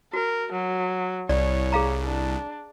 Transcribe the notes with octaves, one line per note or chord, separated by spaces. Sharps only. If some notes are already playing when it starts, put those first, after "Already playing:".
F#4 A#4
F#3
C2 C#5 D5
G#4 F5 A#5
D4